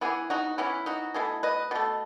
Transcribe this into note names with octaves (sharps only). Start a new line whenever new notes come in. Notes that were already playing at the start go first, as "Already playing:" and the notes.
E3 B3 E4 G#4
D#4 F#4
E3 B3 C#4 E4
D#4 F#4
B2 A3 E4 G#4
B4 D#5
B2 A3